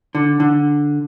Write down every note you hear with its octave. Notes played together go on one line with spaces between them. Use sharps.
D3
D3